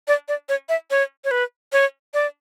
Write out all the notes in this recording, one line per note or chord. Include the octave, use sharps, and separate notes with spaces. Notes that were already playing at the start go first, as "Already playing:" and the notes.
D5
D5
C#5
E5
C#5
C#5
B4
C#5
D5